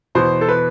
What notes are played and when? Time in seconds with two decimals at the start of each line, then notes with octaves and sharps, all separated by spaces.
0.15 E2 B2 C5
0.41 A4
0.49 B4